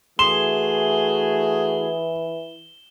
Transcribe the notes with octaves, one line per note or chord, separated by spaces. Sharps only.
E3 A3 F#4 G#4 C6 E7 G7